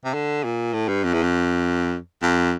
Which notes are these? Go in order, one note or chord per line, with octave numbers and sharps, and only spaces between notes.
C3
D3
A#2
A2
G2
F2
E2
F2
F2